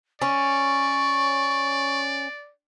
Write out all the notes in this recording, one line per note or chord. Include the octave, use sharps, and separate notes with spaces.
C#4 D5 C#6